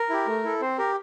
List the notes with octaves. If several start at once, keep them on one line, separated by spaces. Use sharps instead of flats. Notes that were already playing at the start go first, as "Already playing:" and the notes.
Already playing: A#4
E4 G4
A3
E4 A4
C4 C5
G4 A#4